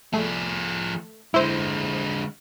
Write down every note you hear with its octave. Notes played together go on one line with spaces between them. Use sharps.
F3 A3 G#4
D3 G#3 E4 C5